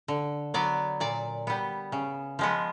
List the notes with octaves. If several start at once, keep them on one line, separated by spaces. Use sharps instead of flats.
D3
F#3 B3 D5
A#2 D5
G3 B3
C#3
F3 G#3 B3